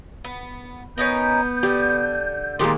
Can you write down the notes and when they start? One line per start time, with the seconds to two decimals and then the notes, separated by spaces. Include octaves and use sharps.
0.24 B3
0.98 B3 C#4 D#4 A#4 G6
1.63 D3 G4
2.59 A#2 D#3 G#3 A#3 G4 C6 D#6